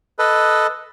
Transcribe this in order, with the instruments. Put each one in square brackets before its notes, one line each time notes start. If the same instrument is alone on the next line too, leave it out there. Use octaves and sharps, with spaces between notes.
[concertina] A4 B4 D#5